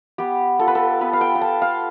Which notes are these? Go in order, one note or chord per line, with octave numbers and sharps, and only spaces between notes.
B3 G4
F4 A4
B4
A4
B3 B4
F5
G5
G5
F4 A5
F5